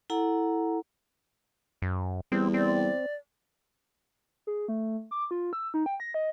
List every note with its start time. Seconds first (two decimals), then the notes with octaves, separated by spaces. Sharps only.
0.10 E4 A4 F#5 A#5
1.82 F#2
2.32 E2 G3 C4
2.54 C4 D5
4.47 G#4
4.68 A3
5.11 D6
5.31 F4
5.53 E6
5.74 D#4
5.86 G5
6.00 A#6
6.14 D#5